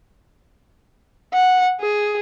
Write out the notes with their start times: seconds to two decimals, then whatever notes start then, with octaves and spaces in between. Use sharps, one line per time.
1.34 F#5
1.81 G#4